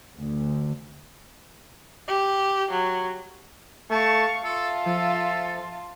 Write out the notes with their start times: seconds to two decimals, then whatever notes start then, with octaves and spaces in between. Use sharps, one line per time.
0.18 D2
2.07 G4
2.71 F#3
3.91 A3 F5 A5 C#6
4.44 F4 A4 E5 A5
4.86 F3 A4